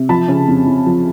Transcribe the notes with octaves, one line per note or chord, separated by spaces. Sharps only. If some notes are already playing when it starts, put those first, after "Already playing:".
Already playing: C3
F3 A5 B5
C#3
F2
F2
F3